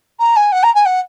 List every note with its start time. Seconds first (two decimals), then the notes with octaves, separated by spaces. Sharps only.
0.20 A#5
0.36 G#5
0.52 F#5
0.63 A#5
0.75 G#5
0.86 F#5